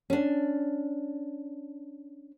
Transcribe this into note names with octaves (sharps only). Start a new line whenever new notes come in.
C#4 D4